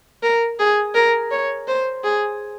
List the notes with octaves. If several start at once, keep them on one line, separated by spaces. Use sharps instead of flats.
A#4
G#4
A#4
C#5
C5
G#4